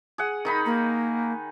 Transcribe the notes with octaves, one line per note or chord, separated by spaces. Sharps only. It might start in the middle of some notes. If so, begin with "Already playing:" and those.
G#4 F#5
D#3 D#4 B5
A#3